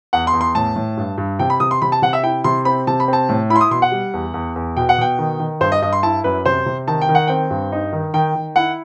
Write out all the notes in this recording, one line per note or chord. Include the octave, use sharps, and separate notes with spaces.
E2 F#5
C6
E2
C6
A2 A5
A2
G2
G2
C3 G5
B5
C3 D#6
C6
C3 B5
A5
C3 F#5
E5
E4 G5
C3 C6
C4 B5
C3 A5
B5
C4 A5
A2
E4 B5
C6
D#6
B2 C6
F#5
G3
E2
E2
E2
B2 G5
F#5
B2 G5
D#3
D#3
G2 C5
D#5
G2 D#5
C6
E4 A5
F#2 B4
C3 C5
C3
D#3 A5
G5
D#3
F#5
C4 G5
G2
D#4
D#3
D#3 G5
D#3
E4 F#5